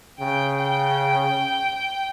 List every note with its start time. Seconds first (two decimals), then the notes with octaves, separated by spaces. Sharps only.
0.20 C#3 G5
0.59 G5